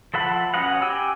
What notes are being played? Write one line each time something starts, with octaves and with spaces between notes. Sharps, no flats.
F3 A4 E5 F#5 B5
C#4 F#4 B4 D#5 F#5
G4 G#5 E6